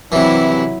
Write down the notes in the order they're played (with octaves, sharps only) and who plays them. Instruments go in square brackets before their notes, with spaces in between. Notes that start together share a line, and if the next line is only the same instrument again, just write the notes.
[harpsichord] C3 E3 [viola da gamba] F#3 E4